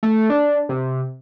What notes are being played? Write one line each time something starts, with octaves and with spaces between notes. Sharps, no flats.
A3
D4
C3